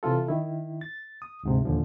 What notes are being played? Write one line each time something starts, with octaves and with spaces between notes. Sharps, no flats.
C3 E3 F4 A4
D#3 E4
A6
D#6
D2 G#2 C3
D#2 A#2 D3 F3